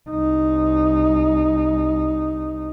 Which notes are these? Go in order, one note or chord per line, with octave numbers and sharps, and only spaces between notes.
C2 D#4